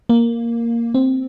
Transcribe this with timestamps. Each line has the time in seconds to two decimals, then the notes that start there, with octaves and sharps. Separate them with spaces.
0.09 A#3
0.94 C4